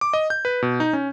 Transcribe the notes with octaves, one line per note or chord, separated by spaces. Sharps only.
D6
D#5
G6
B4
B2
D#4
C#4